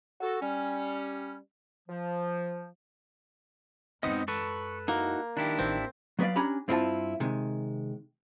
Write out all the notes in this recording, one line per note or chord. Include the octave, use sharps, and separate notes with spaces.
F#4 A4
G3 C#4
F3
F#2 G#3 B3 C4 D#4 D#5 D#6
A4 B4 C#6
A#3 D#4 E4 F#4
D#3 D4 E4 G4
A1 C4
F#3 B3 B4 D5 F5
C#4 D4 G4 G#5 A#5 B5
G2 C4 E4 F4 A4 A5
C3 D#3 G#3